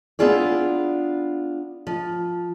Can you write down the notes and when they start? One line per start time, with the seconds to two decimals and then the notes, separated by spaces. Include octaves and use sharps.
0.19 B3 D4 E4 F4 G#4 D5
1.87 F3